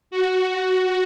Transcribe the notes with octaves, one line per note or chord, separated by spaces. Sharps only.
F#4